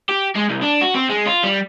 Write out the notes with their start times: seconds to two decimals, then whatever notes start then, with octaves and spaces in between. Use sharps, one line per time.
0.09 G4
0.35 G#3
0.49 C2
0.62 D4
0.81 F#4
0.94 C4
1.10 G#3
1.27 F4
1.44 G3